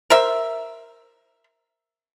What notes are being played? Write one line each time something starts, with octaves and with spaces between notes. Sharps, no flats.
A#4 C5 E5